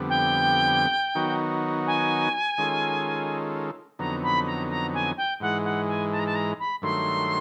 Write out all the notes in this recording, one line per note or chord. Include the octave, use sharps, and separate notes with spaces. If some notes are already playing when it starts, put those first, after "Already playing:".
Already playing: F2 D3 G3 B3
G5
D#3 F#3 B3 D#4 F#4
G#5
D#3 G#3 C#4 F4 A4
F2 D3 F#3 B3 D#4 A#5
B5
A#5
A#5
G#5
G5
G#2 E3 G#3 F#5
F#5
G#5
A5
A#5
A5
A#5
B5
G2 D#3 F#3 A3 C6